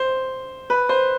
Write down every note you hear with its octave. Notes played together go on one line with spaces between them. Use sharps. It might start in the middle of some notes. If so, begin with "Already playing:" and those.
Already playing: C5
B4
C5